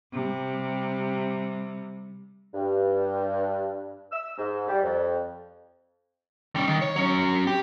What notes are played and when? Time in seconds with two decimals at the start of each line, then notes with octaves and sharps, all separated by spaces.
0.12 C3 G3
2.54 G2
4.11 E6
4.38 G#2
4.68 G3
4.83 F2
6.56 G3 C#4
6.67 D#3
6.82 C#5
6.96 F#3 C#4
7.47 G4